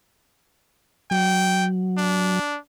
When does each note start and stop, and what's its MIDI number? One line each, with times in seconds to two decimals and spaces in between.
1.11 2.39 54
1.11 1.66 79
1.98 2.58 62